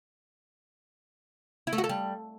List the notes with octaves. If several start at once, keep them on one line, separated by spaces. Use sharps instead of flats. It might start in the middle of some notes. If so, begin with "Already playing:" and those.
E4
A3
F#4
A4
G3